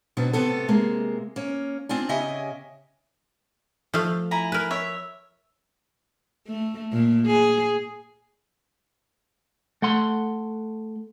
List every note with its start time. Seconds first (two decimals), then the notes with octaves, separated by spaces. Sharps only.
0.17 B2 D3 F#3 B3 C4
0.33 A2 C3 B3 A4
0.68 C3 G#3 A#3
1.36 A#3 C#4
1.89 C4 D4 F4 D5 G#5
2.09 C#3 C#4 G4 D#5 E5 G#5
3.94 F3 A3 F5
4.31 E4 G#5 A#5
4.52 A#4 B4
4.71 C#5 E5
6.47 A3
6.92 A#2
7.27 G#4
9.82 A3 F#5 C6